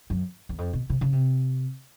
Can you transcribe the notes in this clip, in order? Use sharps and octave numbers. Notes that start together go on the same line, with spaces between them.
F#2
E2
F2
B2
C3
C#3
C3